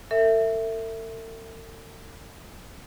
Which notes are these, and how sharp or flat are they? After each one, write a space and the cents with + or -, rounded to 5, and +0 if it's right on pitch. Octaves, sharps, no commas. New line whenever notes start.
A4 +45 E5 +0